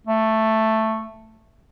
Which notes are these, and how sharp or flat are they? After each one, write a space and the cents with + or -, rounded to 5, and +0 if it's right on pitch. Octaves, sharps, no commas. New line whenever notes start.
A3 +5